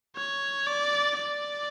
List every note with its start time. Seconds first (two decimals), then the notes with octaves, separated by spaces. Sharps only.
0.16 C#5
0.67 D5
1.17 D5